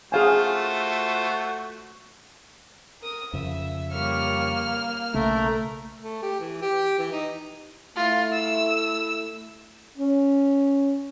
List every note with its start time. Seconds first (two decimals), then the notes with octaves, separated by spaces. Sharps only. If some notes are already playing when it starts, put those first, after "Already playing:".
0.12 A3 F4 F#4 G#4 C5 F5 G#5
3.02 A#4 D#6
3.33 F2 C#3 F3 E5
3.92 G3 A#3 C#5 F6
5.14 B1 C#3 A3 A#3 A#4
6.04 A3
6.22 G4
6.40 E3
6.62 G4
6.99 E3
7.12 D#4
7.96 A3 E4 F4
8.33 E6
9.97 C#4